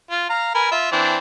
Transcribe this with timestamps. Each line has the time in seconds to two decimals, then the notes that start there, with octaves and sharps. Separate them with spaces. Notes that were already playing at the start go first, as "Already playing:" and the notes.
0.11 F4
0.29 F5 A#5
0.55 A#4 B4 G#5
0.71 F4 E5
0.92 E3 C4 D4